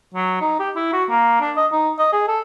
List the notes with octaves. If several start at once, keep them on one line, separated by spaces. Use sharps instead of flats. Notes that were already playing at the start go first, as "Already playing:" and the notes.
F#3
D#4
G4
E4
F#4
A#3
D4
D#5
D#4
D#5
G#4
A4